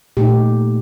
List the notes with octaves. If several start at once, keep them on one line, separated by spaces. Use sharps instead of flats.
A#2 A3 D#4 G4